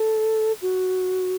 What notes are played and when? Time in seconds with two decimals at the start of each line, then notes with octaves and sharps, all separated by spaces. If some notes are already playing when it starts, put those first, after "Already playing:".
Already playing: A4
0.62 F#4